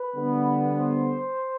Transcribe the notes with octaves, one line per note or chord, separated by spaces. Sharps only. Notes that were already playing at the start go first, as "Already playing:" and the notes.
Already playing: B4
D3 G3 B3
C5